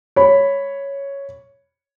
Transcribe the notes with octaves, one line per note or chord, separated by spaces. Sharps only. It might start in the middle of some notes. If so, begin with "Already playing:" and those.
C#5 B5